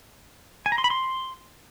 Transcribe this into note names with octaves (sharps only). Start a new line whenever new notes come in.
G#5
A#5
C6
B5
C6